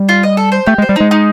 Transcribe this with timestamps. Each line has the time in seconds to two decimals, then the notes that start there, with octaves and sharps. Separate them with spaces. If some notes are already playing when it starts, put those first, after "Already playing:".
Already playing: G3
0.09 F4
0.23 D#5
0.37 A4
0.52 C5
0.66 A3 G4
0.78 G#3 C5
0.89 G3
0.96 G#3 D#4
1.11 D#4